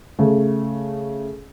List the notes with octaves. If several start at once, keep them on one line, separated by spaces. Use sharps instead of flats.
C#3 A3